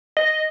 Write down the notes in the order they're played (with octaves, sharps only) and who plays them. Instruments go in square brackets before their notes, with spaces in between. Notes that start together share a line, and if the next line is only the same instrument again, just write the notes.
[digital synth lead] D#5